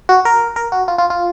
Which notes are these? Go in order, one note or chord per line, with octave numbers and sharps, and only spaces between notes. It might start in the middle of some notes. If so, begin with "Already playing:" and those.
F#4
A#4
A#4
F#4
F4
F4
F4